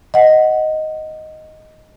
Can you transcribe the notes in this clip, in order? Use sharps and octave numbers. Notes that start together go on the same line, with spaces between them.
D#5 F#5